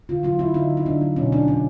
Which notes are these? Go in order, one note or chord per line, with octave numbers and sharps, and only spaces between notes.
D3 F4
F#3 F4
F#3 E4
D3 D#4
F#3
D#4
D3 D4
F#3
B2 C#4
B2 D4
B2 D4